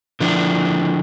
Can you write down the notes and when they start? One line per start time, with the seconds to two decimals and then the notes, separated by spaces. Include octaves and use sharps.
0.20 D3 F3 D4 E4